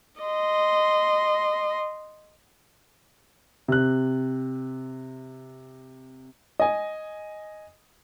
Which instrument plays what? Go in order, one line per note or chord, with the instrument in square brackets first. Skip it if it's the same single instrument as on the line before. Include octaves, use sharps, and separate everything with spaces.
[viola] D#5 C6
[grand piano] C3 F#6
[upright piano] D#5 G#5